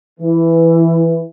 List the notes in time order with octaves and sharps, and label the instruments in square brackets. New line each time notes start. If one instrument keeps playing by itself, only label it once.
[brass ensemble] E3 [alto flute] E4